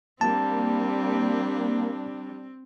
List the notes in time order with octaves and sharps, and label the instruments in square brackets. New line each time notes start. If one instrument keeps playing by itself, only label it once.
[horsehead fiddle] G3 D4 [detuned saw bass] A#3 [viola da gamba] C4 [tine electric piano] A5